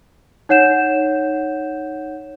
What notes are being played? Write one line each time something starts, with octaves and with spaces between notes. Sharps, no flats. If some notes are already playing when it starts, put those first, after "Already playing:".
D#4 C#5 F#5 G6 E7